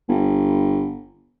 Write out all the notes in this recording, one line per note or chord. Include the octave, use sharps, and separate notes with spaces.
G1